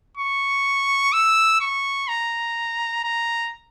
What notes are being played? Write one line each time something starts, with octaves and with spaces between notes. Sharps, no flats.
C#6
E6
C#6
A#5
A#5